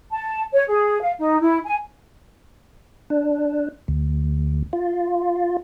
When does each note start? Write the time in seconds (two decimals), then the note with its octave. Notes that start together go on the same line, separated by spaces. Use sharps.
0.11 A5
0.53 C#5
0.68 G#4
1.01 F5
1.19 D#4
1.40 E4
1.65 G#5
3.10 D4
3.88 D2
4.73 F4